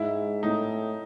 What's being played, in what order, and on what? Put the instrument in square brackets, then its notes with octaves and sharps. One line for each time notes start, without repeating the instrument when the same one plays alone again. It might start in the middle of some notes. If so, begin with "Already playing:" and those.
Already playing: [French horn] G#2 [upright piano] E4
[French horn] A2 [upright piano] D#4